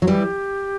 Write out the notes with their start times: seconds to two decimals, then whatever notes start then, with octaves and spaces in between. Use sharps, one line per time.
0.02 F#3
0.07 E3 G3 G4